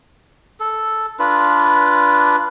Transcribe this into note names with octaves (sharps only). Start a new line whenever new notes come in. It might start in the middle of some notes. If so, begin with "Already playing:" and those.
A4
D4 F4 B4